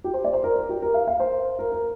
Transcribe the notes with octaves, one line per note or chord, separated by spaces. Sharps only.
G4
C5
D5
C5
A#4
A#4
G4
A#4
F5
F5
C5
A#4
A#4